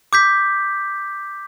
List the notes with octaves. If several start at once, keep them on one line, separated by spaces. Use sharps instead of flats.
D6 G6 B6